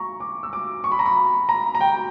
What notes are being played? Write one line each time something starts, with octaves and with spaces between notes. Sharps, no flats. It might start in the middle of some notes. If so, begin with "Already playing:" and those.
Already playing: A#5 C#6
D6
E6
D6
C#6
B5
A#5
B5
A#5
A#5
G5